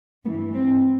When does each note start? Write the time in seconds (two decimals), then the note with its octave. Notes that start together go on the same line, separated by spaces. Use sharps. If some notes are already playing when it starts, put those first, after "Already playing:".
0.25 G2 E3 B3
0.54 C4